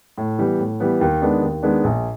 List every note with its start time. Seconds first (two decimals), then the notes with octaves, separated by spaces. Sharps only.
0.18 A2
0.39 E3 G3 B3
0.59 A2
0.80 E3 G3 B3
1.01 D#2
1.22 D#3 G#3 B3 D4
1.42 D#2
1.63 D#3 G#3 B3 D4
1.84 A#1